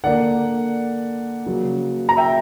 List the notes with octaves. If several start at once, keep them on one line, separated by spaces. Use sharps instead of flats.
D3 A#3 D5 F#5
C#3 F#3 A#3
A#5
E5 G5